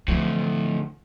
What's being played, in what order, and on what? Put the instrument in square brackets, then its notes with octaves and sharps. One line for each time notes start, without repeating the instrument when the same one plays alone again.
[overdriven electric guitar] D2 A2 [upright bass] E3 F3